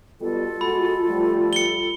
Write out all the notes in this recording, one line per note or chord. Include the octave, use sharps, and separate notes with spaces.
B2 G3 F4 A4
G#3 F#4 B5
F3 G3 A3
C#7 G7